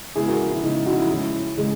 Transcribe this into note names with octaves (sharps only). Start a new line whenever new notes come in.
C#3 G#3 B3 E4 G#4
F#4 A#4
E4
C#3 G#3 B3 D#4
E4
D#4 F#4
E4
C#3 G#3 C#4 E4
C#3 G#3